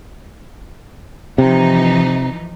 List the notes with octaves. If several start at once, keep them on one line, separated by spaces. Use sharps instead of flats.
C3 E3 F3 D#4